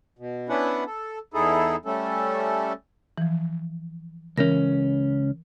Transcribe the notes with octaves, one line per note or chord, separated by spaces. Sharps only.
B2
B3 C#4 D4 E4 B4 F#5
A4
E2 D#4 E4 G#4 A4
G3 A3 C#4 A4
E3 F3
C#2 E3 C#4 A#4 A#6